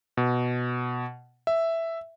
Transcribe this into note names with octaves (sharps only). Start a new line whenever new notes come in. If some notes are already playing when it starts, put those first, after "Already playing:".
B2
E5